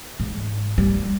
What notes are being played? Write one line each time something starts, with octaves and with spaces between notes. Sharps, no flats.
G#2
G3